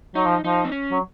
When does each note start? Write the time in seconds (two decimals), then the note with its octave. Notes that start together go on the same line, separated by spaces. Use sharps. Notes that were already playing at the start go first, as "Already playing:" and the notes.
0.15 F#3 D#4
0.25 F3
0.44 F3 D#4
0.65 C4
0.72 C#4
0.91 F#3